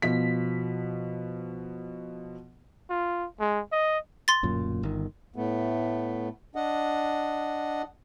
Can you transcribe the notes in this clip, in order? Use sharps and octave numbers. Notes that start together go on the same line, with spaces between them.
B2 F3 B6
F4
G#3
D#5
C6 A6
D1 F#2 A#2
G1 D#3
A2 A3 B3
D4 D#5 F#5